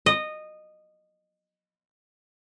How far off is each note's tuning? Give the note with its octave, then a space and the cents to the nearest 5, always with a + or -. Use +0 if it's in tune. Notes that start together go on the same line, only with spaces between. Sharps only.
D#5 -15